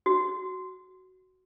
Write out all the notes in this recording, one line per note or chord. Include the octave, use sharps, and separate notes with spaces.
F#4